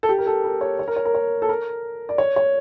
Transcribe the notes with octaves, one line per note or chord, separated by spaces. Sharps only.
A4
G4
A#4
A4
A#4
C#5
C#5
A#4
C#5
A#4
C#5
A4
A#4
D5
C#5
C#5